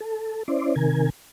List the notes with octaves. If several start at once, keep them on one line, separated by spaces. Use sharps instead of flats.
A4
C#4 E4 C5 D5
C3 D#3 A#4 G#5